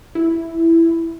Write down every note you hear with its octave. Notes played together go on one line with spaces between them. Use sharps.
E4